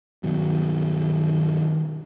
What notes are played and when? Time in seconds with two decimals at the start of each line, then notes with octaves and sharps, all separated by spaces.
0.23 G2 B2 D#3 F#3